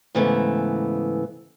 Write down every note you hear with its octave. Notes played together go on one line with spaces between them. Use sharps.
G#2 C#3 E3 A3 B3